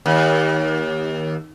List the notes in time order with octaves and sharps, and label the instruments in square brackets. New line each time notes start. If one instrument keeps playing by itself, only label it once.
[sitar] D#2